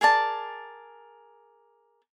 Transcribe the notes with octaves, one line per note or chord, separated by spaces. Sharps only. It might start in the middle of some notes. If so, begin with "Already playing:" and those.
G#4 A#4 D5 A5